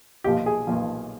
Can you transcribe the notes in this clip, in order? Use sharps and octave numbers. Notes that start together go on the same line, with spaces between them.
B1 A#2 F3 G4
G#4
B1 A#2 F3